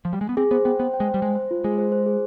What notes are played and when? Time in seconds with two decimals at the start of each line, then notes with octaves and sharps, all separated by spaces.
0.05 F3
0.13 G3
0.21 G#3
0.29 B3
0.37 C4 G#4
0.51 B3 C5
0.65 B3 G5
0.79 B3 C5
0.94 G5
1.00 G#3
1.08 C5
1.14 G3
1.21 G#3 C5
1.36 C5
1.51 F4
1.64 G#3 G#4
1.78 C5
1.92 C5
2.06 G#4